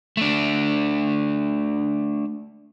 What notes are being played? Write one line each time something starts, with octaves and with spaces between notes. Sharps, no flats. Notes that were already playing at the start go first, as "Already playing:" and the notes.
A3 D4